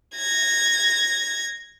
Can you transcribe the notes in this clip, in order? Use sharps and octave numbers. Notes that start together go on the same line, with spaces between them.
G#6 A#6